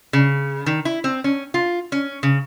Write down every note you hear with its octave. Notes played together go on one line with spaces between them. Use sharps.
C#3
D#3
E4
C4
C#4
F4
C#4
C#3